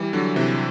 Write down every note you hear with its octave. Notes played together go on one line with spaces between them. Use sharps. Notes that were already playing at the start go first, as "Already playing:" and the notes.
Already playing: E3 G3
D3 F#3
C3 E3